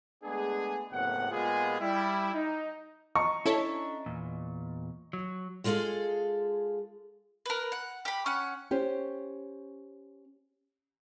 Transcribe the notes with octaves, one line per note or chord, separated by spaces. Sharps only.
G#3 A3 B3 D4 G#4
F#1 A2 C3 B3 F#5
A#2 G#3 B3 F4 G4 G#4
G3 E4
D#4
D#5 A#5 C#6
C#4 D4 E4 A4 C#5 E5
E2 A#2
F#3
G#3 F4 G#4 A4 F5
A#4 B4
F#5
G4 B5
C#4 F#5
C#4 G4 C5